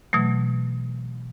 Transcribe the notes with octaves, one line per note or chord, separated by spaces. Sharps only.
B2 E3 F#3 A3